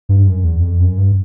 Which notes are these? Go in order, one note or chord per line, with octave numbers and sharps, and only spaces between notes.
G2
F#2
E2
F2
F#2
G2